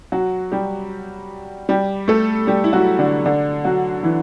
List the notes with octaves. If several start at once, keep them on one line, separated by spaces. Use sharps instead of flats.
F#3 F#4
G3 G4
G3 G4
A3 A4
G3 G4
E4
F#3 F#4
D3 D4
D3 D4
F#3 F#4
E3 E4